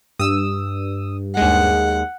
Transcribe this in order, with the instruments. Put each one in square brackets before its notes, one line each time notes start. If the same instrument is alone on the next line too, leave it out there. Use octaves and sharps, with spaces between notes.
[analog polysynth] G2 [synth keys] D#6 E6
[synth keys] D#2 G#3 [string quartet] F#5